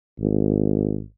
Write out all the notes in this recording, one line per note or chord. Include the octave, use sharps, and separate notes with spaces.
G#1